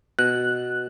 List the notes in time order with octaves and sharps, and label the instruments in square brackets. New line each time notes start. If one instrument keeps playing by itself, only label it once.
[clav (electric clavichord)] B2 [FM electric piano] F#6